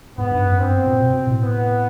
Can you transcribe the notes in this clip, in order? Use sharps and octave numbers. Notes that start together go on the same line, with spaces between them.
G#2 B3
G2
F#2
G2 C4
A#2
B2
B2
A2
B3